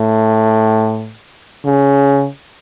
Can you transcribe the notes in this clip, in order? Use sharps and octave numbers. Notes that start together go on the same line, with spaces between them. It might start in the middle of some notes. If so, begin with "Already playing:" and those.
Already playing: A2
C#3